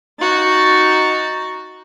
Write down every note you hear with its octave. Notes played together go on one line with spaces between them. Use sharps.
D#4 F#4 A6